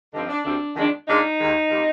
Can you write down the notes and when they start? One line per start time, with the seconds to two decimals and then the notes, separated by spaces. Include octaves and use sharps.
0.13 G2 D3 F3 C4 D#4
0.29 D4
0.44 D2 D3 G3 C4 D4
0.76 F2 D#3 G#3 D4
1.07 A#2 G#3 D4 D#4
1.38 D#2 D#3 G#3
1.70 A#2 G3 C4